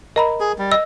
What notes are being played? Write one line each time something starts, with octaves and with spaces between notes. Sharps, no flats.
A#4 D#5 A#5 B5
G#4
G3
D#5 E6